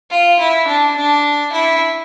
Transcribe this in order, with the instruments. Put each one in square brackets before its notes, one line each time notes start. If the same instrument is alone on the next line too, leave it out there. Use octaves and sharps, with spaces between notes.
[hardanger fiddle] F4
E4
D4
D4
E4